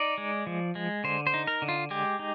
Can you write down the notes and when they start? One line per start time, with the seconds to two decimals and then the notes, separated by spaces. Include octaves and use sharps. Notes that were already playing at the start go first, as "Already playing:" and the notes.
Already playing: D#4 D5
0.18 G#3
0.47 F3
0.75 G#3
1.04 D3 C5
1.27 C5
1.34 D#4
1.47 A#4
1.62 D3
1.68 F4
1.90 G#3 G4
2.19 D#4